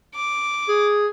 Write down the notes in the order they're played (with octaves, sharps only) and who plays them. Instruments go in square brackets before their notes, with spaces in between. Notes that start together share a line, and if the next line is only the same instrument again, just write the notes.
[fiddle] D6
[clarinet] G#4